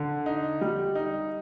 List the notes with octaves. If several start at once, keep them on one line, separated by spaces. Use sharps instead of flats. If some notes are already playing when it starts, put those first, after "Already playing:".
Already playing: D3
D#4
G3
D#4